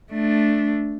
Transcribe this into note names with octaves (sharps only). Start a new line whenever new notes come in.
A3 D4